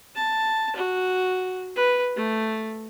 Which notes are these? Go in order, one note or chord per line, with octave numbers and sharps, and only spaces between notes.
A5
F#4
B4
A3